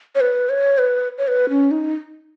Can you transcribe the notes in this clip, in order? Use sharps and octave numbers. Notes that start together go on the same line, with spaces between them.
C#5
B4
C#5
B4
C#5
B4
C#4
D#4